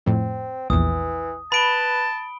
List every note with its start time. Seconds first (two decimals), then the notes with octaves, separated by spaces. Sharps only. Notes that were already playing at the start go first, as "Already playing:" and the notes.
0.06 F2 A2 C4
0.70 A#1 E2 E3 D#6
1.52 B4 A5 B5 D7 G7